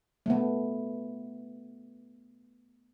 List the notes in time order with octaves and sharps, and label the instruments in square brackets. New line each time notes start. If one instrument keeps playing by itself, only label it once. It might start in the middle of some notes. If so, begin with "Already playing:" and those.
[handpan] A3 B3